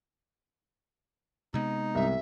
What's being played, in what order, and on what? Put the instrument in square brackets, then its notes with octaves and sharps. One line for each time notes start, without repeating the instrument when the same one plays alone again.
[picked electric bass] C3 G#3 B3 [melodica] D#4
[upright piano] C2 [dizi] E5